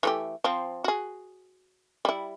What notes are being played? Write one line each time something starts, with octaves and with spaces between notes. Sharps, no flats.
E3 A3 G4
F3 C4
F#4 G#4
G3 E4